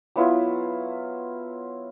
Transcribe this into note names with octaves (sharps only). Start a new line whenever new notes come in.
F#3 B3 E4 F4